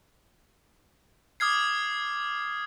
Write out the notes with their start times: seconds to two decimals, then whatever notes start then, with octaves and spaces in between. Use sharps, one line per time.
1.40 D6 D#6 F6 G#6 C7